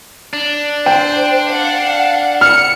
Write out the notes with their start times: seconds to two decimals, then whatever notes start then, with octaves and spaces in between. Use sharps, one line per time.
0.33 D4
0.86 C5 G5
1.50 F5 F#5
2.41 F6 C#7